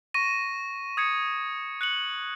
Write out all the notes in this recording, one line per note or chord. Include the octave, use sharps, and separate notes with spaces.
C#6 A#6 D#7
D#6 G#6 C#7
F#6 C#7 F#7